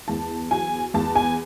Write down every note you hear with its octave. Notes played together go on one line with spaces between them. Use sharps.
E2 A5
F#3 G#5
E2 A5
G#5